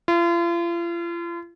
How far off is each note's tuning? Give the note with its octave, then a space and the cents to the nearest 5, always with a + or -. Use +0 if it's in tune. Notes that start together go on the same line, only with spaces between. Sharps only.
F4 -40